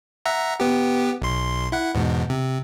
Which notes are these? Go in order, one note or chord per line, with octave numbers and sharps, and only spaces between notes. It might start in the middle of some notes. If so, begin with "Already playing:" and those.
E5 F#5 A#5
B3 G4
B1 C6
E4 F#5
E2 G#2 B2
C3